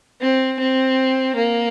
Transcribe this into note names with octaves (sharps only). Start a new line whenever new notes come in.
C4
C4
A#3